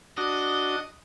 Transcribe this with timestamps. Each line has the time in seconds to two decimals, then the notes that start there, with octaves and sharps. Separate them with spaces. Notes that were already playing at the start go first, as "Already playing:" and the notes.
0.18 D4 F#4 D#5